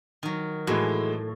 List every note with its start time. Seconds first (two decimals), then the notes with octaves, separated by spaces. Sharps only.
0.23 D#3 F#3
0.67 A2 E3 G#3 F#4